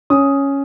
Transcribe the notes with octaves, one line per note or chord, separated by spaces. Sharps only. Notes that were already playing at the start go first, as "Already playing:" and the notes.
C#4 D#6